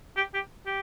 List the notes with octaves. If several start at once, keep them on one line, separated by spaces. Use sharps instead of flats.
G4
G4
G4